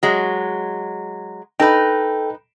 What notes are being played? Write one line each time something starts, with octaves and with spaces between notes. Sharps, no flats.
F#3 G#3
D#4 A4 B4 G5